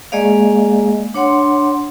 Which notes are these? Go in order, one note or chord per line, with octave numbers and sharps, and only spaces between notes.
G#3 A#3 G#4 D5 D#5 F5
D4 C#5 F#5 C6